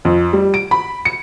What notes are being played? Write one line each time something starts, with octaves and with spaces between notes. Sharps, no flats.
F2
G3
D7
B5
C#7